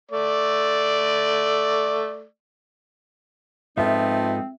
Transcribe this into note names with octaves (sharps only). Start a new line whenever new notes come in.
A3 D5
G#2 F3 B3 C4 D#4 F4 A4 E5